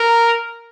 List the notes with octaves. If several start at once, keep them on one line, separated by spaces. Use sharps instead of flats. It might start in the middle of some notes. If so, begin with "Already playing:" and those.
Already playing: A#4